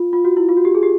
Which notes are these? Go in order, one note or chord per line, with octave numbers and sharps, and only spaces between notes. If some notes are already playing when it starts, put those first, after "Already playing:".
Already playing: F4
F4
F#4
E4
F4
F#4
G4
G#4
G4